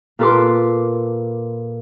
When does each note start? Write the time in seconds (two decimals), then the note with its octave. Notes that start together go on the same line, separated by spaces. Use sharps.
0.19 A#2 F4 A4 B4 C6 D6